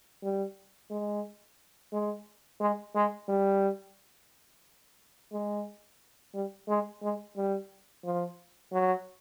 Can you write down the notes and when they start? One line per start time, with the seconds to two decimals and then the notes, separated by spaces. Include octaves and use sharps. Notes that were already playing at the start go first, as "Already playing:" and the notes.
0.23 G3
0.90 G#3
1.92 G#3
2.60 G#3
2.95 G#3
3.28 G3
5.32 G#3
6.34 G3
6.68 G#3
7.02 G#3
7.37 G3
8.04 F3
8.72 F#3